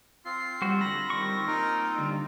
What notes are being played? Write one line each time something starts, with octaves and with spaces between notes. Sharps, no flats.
C4 F4 C7
G3 F#4 C5
D3 B5 A#6
D#3 G3 C#6
A#3 D#4 A#4
D3 G3